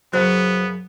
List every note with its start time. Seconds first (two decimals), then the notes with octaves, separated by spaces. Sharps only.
0.13 F#2 C#3 F#3 B3 C5 F#6